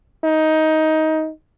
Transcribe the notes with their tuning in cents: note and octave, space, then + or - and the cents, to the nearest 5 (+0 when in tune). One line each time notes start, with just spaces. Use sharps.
D#4 +15